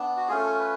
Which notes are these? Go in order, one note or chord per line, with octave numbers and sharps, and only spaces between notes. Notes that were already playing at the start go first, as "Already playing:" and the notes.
Already playing: B3 D4
F#4
A3 C#4 F4 G#4
A4
B4